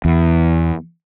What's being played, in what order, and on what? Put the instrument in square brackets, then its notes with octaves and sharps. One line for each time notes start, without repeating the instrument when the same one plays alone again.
[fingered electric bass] E2